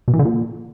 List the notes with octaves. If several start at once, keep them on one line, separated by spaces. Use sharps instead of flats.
B2
E3
D3
A#2